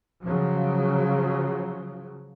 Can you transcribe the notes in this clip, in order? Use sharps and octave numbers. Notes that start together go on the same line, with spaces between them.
C#3 F3 F#3